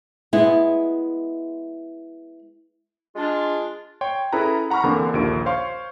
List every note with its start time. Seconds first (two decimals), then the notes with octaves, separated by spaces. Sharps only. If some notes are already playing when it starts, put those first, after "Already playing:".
0.33 G#3 B3 E4
3.16 G#3 D4 F4
4.01 C#5 G5 C6
4.33 C#4 E4 G#4 A4 B4 A#5
4.70 F#5 A#5 B5 C#6 F6
4.83 E2 D3 A#3 C4
5.13 A#1 D#2 D3 A#3 F4 D7
5.46 C5 C#5 F5 C6 C#6